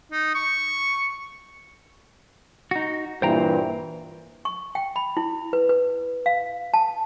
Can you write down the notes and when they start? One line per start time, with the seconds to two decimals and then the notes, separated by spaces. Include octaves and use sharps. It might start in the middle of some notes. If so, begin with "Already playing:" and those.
0.12 D#4
0.35 C#6
2.71 D#4 F#4
3.22 G2 A#2 E3 C5 G5 A#5
4.45 C#6
4.75 G5
4.96 B5
5.17 E4
5.53 B4
5.69 B4
6.26 F5
6.74 A5